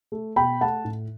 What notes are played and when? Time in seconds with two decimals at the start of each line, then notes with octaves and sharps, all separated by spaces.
0.12 A3
0.36 B2 G5 B5
0.61 A3 F#5 A5
0.85 A2